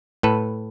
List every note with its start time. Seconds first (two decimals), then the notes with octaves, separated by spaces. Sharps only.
0.23 A2 A4 B4